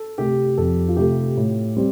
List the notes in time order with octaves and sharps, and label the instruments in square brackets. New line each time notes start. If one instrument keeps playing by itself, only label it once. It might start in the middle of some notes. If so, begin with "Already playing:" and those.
Already playing: [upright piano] A4
[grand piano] C3 A3 [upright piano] G4
[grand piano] F2 [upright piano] A4
[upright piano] F4
[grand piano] C3 A3 [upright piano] G4
[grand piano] A2
G3 C4